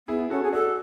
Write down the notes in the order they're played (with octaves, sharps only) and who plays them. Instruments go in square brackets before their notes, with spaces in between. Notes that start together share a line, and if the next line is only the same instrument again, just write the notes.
[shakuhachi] B3 [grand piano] E4 G#4
[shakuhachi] C#4 [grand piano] F#4 A4
[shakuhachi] G#4
[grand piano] D4 F#4 [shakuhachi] A4